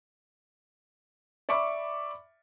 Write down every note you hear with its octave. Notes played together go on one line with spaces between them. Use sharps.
D5 E5 B5 C#6 D6